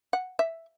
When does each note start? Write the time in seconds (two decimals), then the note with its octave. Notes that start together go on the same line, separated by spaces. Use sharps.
0.13 F#5
0.39 E5